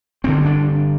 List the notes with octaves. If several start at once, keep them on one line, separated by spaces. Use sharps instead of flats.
G1 G2 D3 C4
D4